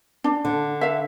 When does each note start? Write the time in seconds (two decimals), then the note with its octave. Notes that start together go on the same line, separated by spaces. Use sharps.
0.24 D4
0.45 D3
0.81 E5 F5